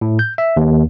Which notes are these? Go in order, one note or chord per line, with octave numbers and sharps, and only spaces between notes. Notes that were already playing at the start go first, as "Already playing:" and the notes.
A2
G6
E5
D#2